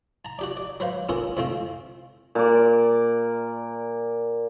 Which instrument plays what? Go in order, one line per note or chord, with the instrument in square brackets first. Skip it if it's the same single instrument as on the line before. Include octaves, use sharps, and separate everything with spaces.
[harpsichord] A5 A#5
F#4 G4 D5
D5
F#3 B4 C5 F5
A#3 B3 C#4 F4 A4 A#4
F2 F3 A3 C4 F4
[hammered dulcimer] A#2 D5